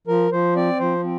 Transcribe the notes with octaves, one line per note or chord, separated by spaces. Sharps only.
F3 A#4
F3 C5
C4 D5
F3 C5
C4